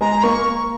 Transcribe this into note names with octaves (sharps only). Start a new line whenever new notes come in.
G#3 A#5
A#3 C#6